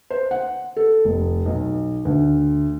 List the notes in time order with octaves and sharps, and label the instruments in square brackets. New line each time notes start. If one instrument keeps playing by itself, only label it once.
[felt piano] C5
F#5
A4
F1
B1
D2